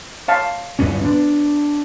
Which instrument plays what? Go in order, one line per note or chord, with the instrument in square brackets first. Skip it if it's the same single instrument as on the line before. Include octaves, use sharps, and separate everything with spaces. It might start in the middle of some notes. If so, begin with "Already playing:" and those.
[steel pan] C#5 F5 A5
[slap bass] D1 G2 C#4
[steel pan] B3 [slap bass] D4